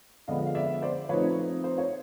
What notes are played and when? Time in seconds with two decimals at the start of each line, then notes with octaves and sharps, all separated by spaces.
0.28 D3 F3 G#3 B3 D#5 F5
0.47 F5
0.55 D5 E5
0.82 C5 D5
1.09 F3 A3 C4 D#4 B4 C#5
1.64 C5
1.78 C#5